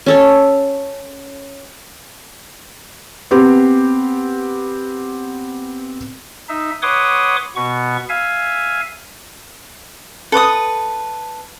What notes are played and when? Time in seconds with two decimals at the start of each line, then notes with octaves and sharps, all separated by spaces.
0.06 C#4 A4 C#5
3.31 B3 C4 G4
6.49 D#4 E5
6.83 B4 C#5 F#5 C6 D6 D#6
7.56 B2 B3 C#6
8.09 E5 F5 G#5
10.32 A4 B4 D6 D#6